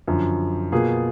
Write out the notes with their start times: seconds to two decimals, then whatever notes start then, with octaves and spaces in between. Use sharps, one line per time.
0.08 F#2 D3 F3
0.72 B2 A#3 F4 G#4